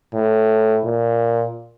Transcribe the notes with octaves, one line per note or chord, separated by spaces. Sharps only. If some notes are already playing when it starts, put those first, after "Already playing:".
A2
A#2